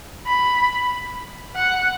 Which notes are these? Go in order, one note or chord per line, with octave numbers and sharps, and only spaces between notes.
B5
F#5